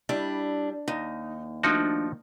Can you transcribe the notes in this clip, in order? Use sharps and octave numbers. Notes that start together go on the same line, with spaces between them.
G3 D4 E4 D5
D#2 D#4
F3 A3 D4 D#4 F#4